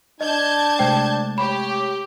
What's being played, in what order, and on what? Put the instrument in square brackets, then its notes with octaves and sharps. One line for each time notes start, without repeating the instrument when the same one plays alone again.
[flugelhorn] D4 [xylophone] D#5 [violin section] A5 G6 G#6
[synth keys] C3 G#3 A3 [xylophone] C5 G5
[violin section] G4 [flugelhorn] C#5 [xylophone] B5